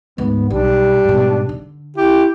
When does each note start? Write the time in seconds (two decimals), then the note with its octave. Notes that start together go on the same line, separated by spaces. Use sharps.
0.18 D2 G#2 B3
0.50 B1 G3 D4
1.04 G#2 B2
1.49 D3
1.97 E4 G4